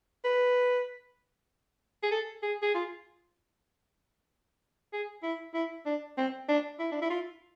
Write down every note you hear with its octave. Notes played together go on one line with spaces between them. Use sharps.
B4
G#4
A4
G#4
G#4
F4
G#4
E4
E4
D4
C4
D4
E4
D4
E4
F4